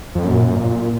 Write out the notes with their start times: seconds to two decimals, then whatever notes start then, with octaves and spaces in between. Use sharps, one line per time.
0.15 F2
0.25 F#2 A#2
0.56 A#2